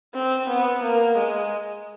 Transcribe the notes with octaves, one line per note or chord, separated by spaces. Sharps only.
C4
B3
A#3
G#3